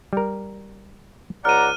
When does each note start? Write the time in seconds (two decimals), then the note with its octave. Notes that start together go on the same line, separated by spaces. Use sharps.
0.13 G3 A#4
1.45 C#2 D5 F#5 A#5 F6 D#7